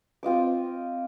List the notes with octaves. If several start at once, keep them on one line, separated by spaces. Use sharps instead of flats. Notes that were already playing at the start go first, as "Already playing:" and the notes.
C4 F4 D#5 D6